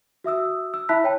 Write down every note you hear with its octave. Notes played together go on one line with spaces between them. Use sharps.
F#4 E5 D#6 E6
E6
E4 E5 A5 B5 F#6 B6
C#5 G5 A5